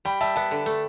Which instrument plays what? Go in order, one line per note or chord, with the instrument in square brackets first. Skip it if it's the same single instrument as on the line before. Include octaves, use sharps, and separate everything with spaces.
[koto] G3 [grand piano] G5 B5
[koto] G3 [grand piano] E5 A5
[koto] B3 [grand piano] E5 A5
[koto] D3
A3